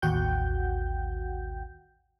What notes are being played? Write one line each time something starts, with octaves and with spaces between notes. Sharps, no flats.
A1 D#2 F#4 F#5 G5 G6